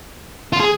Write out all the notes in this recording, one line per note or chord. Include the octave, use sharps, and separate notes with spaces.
F4
G#4